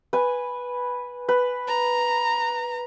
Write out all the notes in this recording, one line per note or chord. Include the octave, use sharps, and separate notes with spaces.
B4 G#5
B4
A#5